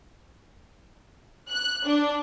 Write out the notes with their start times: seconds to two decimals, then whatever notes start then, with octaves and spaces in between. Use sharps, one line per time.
1.49 F#6
1.85 D4